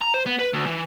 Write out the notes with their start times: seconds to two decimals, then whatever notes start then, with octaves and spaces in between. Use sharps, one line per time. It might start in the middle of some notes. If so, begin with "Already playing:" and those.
0.01 A#5
0.14 C5
0.26 B3
0.39 B4
0.54 D2
0.66 E3